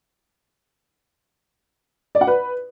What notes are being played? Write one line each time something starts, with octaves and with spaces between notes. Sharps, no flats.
D5
F#5
B4